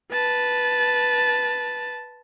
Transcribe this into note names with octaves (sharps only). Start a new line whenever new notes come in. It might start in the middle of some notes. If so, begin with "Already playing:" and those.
B4 A5